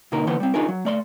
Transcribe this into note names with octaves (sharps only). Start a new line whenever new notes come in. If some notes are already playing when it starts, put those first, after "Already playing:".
B2 D3 A#3 D#4 A#4
D3 E3 A#3 B3 C5
G3 C4
D4 D#4 F4 G#4 A#4
F#3
A3 D5 C6